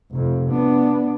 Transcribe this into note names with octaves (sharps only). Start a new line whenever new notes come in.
F1 F2
B3 D4